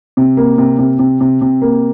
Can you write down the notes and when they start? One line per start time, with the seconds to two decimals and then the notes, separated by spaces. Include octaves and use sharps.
0.17 C3
0.37 A#3
0.58 C3
0.79 C3
0.99 C3
1.21 C3
1.42 C3
1.62 A#3